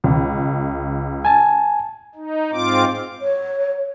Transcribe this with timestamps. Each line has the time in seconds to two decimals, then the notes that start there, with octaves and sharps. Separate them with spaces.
0.04 C#2
1.25 G#5 A5
2.15 D#4
2.52 G#2 C4 F4 D6
3.22 C#5